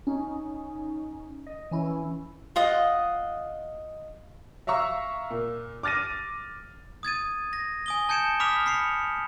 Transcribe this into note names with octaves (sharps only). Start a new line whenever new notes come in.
C#4 D#4
D#5
E3 C#4 E4
F4 D#5 F#5
E5 F5 A#5 C#6 E6
A#2
D6 F6 A6 A#6 D#7
D#6 G#6 A6 D#7
A#6
G#5 D#6 G7
A5 G6 G#6 C#7 D7 E7
B5 D6 D#6 F6 B6 F7
B5 C7 C#7